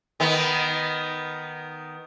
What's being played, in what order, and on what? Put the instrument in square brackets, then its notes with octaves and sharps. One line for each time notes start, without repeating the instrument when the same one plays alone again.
[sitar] D#3 B3